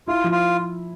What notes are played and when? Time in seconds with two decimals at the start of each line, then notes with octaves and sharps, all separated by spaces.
0.08 E4 F4
0.24 F3
0.31 F4